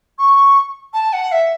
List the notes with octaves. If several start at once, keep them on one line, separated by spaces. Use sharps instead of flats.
C#6
A5
F#5
E5